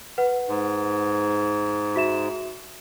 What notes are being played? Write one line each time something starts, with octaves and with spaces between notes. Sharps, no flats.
B4 F#5
G#2
F#4 E5 E7